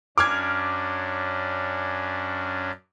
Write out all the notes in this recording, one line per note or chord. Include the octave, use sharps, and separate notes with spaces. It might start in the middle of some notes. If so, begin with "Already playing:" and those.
F#2 C#4 D4 D6 F6 G#6